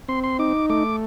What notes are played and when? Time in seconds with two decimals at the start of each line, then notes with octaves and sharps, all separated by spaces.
0.09 C4 C6
0.24 C6
0.39 D#4 D6
0.70 A3 D6